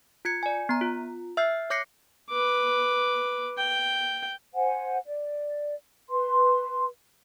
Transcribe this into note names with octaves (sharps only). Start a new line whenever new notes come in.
F4 G#6 C#7
D5 G#5
B3 A#5
F4
E5 E6 F6 G6 C7
C#5 D6 G6 A#6 C7 C#7
B4 D6
G5
C5 F#5 G#5
D5
B4 C6